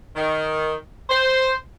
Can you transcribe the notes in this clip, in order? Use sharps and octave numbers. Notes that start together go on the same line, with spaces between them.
D#3
C5